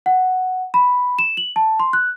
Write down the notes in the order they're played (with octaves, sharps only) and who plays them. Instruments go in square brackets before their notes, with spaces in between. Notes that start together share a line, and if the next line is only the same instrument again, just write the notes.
[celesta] F#5
B5
E7
F#7
A5
C6
F#6